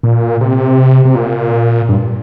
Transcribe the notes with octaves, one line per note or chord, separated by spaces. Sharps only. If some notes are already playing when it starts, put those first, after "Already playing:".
A#2
C3
C3
A#2
G2